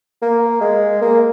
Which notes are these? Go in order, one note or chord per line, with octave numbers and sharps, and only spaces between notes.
A#3
G#3
A#3